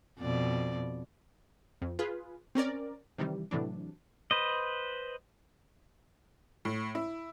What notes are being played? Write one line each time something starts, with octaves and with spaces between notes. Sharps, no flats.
F2 B2 D5
F2
F4 G#4 B4
C4 C#4 A#4 D5
C3 D#3 E3 G3
A2 C3 E3 F#3 D4
B4 C5 D#5
A2
E4